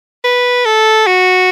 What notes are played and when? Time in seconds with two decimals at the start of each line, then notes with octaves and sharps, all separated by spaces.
0.24 B4
0.65 A4
1.07 F#4